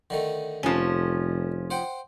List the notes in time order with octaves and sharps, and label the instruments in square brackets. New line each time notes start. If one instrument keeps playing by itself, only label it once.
[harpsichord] D3 D#3 A3
[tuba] F1 [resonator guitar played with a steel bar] F3 C#4
[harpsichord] C5 F#5 G5